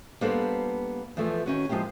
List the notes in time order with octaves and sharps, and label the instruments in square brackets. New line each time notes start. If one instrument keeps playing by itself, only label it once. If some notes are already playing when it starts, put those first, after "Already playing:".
[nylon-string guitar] G3 A#3 B3 D4 A4 C5
E2 E3 F3 A3
D#3 C#4 F#4
F3 G#3 A#3 E4 G4